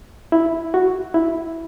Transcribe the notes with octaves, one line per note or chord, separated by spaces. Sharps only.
E4
F#4
E4